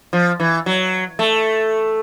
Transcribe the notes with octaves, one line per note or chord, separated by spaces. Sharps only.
F3
E3
F#3
A3